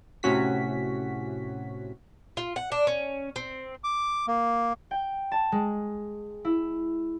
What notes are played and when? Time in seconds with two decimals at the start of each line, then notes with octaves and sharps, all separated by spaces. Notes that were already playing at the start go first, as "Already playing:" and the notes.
0.23 A2 C3 C#4 F#4 B6
2.37 F4
2.56 F#5
2.72 D4
2.87 C#4
3.36 C4
3.84 D6
4.28 A#3
4.91 G5
5.32 A5
5.52 G#3
6.45 E4